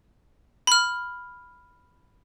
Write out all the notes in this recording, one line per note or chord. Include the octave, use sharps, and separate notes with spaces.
B5 F6